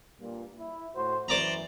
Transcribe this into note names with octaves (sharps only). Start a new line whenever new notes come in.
G2 A#2
E4
A2 F#4 C5
F#2 E3 C5 D5 A#5